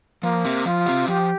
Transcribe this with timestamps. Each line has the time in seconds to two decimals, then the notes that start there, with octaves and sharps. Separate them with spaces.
0.23 F3 A#3
0.45 C4 G4
0.65 F3 F4
0.86 C4 G4
1.08 F3 G4